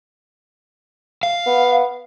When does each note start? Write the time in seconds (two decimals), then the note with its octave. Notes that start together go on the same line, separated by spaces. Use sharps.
1.23 F5
1.46 B3